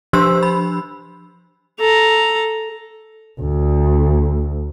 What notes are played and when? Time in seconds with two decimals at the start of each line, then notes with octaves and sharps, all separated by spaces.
0.13 F3 D4 G4 C5 C6 E6
0.43 B5
1.80 A4 A#5
3.40 D2